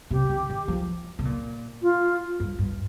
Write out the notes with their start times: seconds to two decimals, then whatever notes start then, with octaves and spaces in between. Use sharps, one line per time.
0.11 C3 G4
0.30 D3
0.50 D#3
0.68 F3
1.19 C3
1.25 A#2
1.82 F4
2.40 G2
2.59 G2